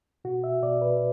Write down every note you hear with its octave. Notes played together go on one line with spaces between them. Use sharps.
B2 F#4
E5
B2 D5
B4